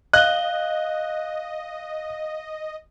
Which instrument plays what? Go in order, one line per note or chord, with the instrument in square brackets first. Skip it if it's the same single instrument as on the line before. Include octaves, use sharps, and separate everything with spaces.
[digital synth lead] D#5 [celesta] F5 G7 [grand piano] F#6